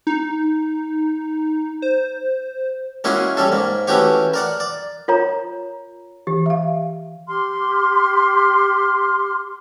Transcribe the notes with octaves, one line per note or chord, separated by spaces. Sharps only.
D#4
C5
G#3 A#3 C#4 E4 F#4 G#4
G3 C#4 A4
G#2 A#3
E3 A3 C#4 F#4 G4 C#5
A#4 D5 F#5
D5
F4 A#4 C#5 A#5
E3 G4
E5 F5
G4 C6 F6